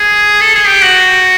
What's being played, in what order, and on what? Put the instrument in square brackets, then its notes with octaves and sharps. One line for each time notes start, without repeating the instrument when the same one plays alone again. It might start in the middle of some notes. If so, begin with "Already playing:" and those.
Already playing: [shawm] G#4
A4
G#4
G4
F#4